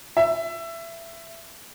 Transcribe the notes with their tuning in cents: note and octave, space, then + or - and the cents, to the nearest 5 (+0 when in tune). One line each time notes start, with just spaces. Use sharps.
E5 +20